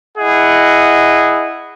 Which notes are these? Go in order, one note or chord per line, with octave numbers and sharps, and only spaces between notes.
E4 G#4 D#5 F#5